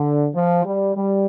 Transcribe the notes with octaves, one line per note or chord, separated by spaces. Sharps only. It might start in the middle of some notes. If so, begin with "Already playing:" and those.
Already playing: D3
F3
G3
G3